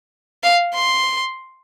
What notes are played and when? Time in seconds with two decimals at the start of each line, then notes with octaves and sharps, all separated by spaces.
0.43 F5
0.74 C6